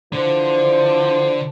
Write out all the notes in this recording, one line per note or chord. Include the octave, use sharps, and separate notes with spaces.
D3 E3 F3 C5